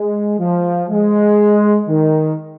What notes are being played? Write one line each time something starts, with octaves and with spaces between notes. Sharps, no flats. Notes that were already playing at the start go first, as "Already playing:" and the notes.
Already playing: G#3
F3
G#3
D#3